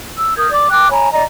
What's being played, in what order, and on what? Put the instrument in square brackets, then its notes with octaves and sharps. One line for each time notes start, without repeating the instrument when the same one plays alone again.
[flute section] E6
A#4 D#6 G6 G#6
D5 D6
G5 D6 F#6
C#5 G#5 A#5 B5
D5 D#5 A#5